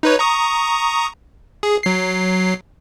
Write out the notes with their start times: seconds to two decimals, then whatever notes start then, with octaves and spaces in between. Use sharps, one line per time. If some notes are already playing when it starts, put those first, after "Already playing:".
0.03 D#4 B4 C#5
0.19 A#5 C#6 D#6
1.63 G#4
1.83 F#3 C7